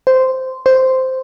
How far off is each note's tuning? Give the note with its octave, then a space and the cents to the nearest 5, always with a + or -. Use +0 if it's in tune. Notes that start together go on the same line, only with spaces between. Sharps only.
C5 -10
C5 -5